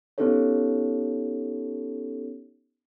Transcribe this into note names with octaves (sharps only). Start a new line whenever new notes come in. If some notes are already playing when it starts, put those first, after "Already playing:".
B3 C#4 D#4 G4 A4 C#5